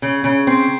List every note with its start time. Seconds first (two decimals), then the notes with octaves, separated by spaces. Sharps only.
0.02 C#3
0.24 C#3
0.47 C4